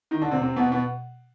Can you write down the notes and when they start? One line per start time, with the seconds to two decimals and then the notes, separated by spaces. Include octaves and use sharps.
0.11 D#3 D#4
0.22 D3 D4
0.31 C3 C4
0.42 C3 C4
0.57 B2 B3
0.72 B2 B3